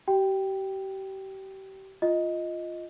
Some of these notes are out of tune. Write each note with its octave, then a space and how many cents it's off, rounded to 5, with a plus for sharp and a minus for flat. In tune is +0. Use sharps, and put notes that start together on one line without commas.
G4 -35 G5 +0
F4 +0 D#5 +10